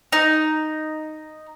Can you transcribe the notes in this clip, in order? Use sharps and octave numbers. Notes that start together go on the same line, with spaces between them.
D#4